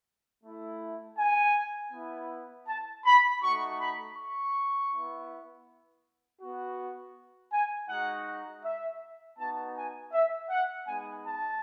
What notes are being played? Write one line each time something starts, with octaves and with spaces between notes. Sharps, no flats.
A3 E4
G#5
B3 E4
A5
B5
A3 D#4 F#4 C#6
B5
C#6
B3 E4
B3 F#4
G#5
G#3 D#4 F#4 F#5
E5
B3 D#4 F#4 A5
G#5
E5
F#5
G#3 B3 D#4 G#5
A5